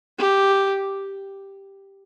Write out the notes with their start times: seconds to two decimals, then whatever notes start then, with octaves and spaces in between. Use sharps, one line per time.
0.18 G4